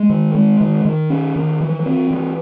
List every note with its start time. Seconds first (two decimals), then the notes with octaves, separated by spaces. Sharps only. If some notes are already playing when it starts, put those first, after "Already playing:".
Already playing: G#3
0.09 D#3
0.35 G#3
0.61 D#3
0.85 D#3
1.10 C#4
1.36 D#3
1.60 E3
1.86 C4
2.11 E3